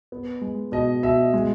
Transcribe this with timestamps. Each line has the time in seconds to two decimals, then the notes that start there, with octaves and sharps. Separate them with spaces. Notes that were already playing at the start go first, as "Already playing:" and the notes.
0.12 B3
0.42 G#3
0.72 B2 D#5
1.03 B2 E5
1.33 G#3